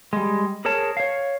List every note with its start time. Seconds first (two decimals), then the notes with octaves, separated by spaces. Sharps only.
0.13 G3 G#3
0.65 G#4 A#4 C#5 A5
0.97 C#5 F5